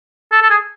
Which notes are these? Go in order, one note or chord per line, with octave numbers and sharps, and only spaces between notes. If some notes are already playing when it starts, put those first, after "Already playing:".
A4
A4
G#4